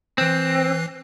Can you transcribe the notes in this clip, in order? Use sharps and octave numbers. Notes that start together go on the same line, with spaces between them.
E3 C4 F#6 C7